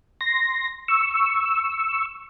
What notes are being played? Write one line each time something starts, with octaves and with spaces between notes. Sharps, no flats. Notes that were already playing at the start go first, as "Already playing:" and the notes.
C6 A#6
C#6 E6